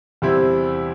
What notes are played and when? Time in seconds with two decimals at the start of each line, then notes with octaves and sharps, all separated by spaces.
0.22 E2 C3 G3 C4 E4